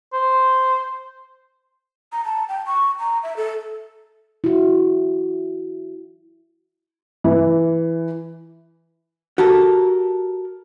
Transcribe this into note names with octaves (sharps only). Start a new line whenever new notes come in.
C5
A#5
A5
G5
C#6
A#5
E5
A4
E4 F#4
E3
F#4 G4 A4 A#4